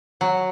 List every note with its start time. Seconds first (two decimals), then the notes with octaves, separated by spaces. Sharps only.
0.21 F#3